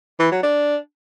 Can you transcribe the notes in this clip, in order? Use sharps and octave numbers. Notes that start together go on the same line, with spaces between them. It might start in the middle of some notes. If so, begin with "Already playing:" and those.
E3
F#3
D4